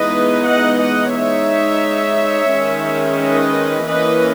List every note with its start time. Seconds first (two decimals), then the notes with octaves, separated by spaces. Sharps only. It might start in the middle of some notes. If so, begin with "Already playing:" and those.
Already playing: E3 G#3 B3 D#4 B4 D#5
0.47 D#5 F#5
0.80 D#5 F#5
1.14 G#3 D#4 C#5 E5
2.51 D#3 G#3 C#4
3.19 B4 D#5
3.88 E3 A#3 C#4 B4 D#5